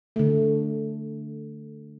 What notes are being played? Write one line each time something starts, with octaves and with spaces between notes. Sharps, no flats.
D3 A3